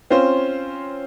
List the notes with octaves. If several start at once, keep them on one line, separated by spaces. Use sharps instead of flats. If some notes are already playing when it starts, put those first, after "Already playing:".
C4 C#4 F4 C5